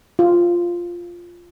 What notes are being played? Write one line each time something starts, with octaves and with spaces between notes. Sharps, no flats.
F4